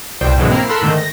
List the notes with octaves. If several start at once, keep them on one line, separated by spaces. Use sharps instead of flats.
C2 B2 G3 C5 G5
G#2 B2 D3 E3 F#3 G#3
A#3 C4 E4 A#5 C7
A4 A#4 B5 C6 E6 F#6
G#2 D3 D#3 A3 G6
A#6